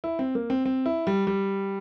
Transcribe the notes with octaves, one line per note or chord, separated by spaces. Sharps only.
E4
C4
A#3
C4
C4
E4
G3
G3